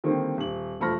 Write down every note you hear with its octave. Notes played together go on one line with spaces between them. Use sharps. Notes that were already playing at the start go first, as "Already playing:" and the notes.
D3 D#3 G3 A#3 C4
D#1 F#7
E1 F3 A3 B5 F6 A#6